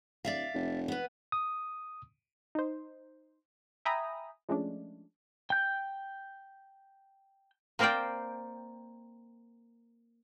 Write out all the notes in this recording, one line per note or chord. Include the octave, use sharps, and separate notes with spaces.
D1 D5 E5 F5
F1
B3 B4
D#6
D#4 C5
E5 G5 G#5 A#5 B5 D#6
F3 G#3 A3 C#4 D4
G5 G6
A#3 C4 A#4 C5 D5 G5